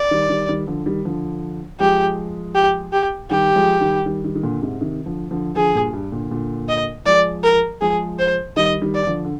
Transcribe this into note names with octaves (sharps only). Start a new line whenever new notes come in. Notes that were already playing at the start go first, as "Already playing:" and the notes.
Already playing: D5
D#3 G3
D#3 G3
D#3 G3
D3 F3
D#3 G3
D3 F3
F3 G#3 G4
G4
G4
D#3 G3 G4
F3 G#3
D#3 G3
D#3 G3
D#3 G3
D#3
A#2 D3
G#2 C3
C3 D#3
D3 F3
D3 F3
D3 F3 G#4
G2 A#2
G2
A#2 D3
A#2 D3
D#5
F3 G#3 D5
A#4
F3 G#3 G#4
C5
D#3 G3 D#5
D#3 G3
D5
D3 F3
D3